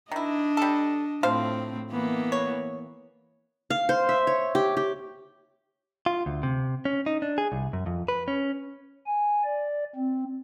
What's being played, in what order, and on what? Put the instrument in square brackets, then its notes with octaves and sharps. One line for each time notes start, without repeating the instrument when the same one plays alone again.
[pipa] D#3 E4 [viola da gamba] D4 D#5
[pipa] G3 A4
[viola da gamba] A2 C4 [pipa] F3 C5 F5
[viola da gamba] E3 A#3 B3
[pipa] C#5
[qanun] F5
C5
E5
C#5
G4
G4
[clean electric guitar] F4
D2
C3
C#4
D#4
D4
G#4
C2
F#2
F2
B4
C#4
[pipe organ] G#5
D5
C4